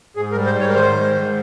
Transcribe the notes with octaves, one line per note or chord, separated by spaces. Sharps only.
G#2 G#4
A#4
G3
C5
G#2 C#5
A#4
D#3 C5
G#2
G#2